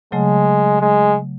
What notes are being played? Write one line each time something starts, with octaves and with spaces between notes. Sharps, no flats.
C#3 F#3 G#3 A3
G#3